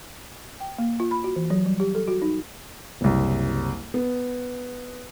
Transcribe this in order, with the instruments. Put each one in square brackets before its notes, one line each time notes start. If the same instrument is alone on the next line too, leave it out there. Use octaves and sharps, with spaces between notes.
[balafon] G5
A#3
F4
B5
F#4
E3
F#3
G3
G4
A4
F#4
D#4
[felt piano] F#1 C2
B3